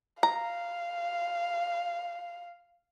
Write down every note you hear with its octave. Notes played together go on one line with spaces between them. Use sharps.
F5 A#5